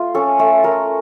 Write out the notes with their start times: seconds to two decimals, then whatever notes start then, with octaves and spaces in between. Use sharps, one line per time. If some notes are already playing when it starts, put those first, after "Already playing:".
Already playing: A3 F4
0.14 C#4 A4
0.39 A3 A4
0.64 A3 A#4